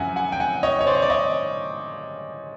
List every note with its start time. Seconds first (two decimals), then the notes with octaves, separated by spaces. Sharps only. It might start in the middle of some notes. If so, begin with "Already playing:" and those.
Already playing: F#2 C#3 F3 E5 F#5 G#5
0.16 F#5 G#5
0.32 G5
0.40 F#5 G#5
0.63 C#5 D#5
0.81 C#5
0.87 C5 D5
0.95 C#5
1.02 D5
1.10 C#5 D#5